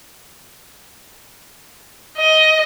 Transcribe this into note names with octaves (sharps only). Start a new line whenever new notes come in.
D#5